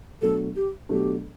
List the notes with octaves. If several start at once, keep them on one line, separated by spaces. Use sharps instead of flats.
B2 F#3 A3 D4 A4
G4
B2 F#3 A3 D4 G4